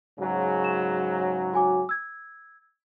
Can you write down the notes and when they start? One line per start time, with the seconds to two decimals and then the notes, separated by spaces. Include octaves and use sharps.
0.19 G#2 C#3 F#3
0.64 E7
1.54 F#4 G#5 D6
1.89 E6 G#6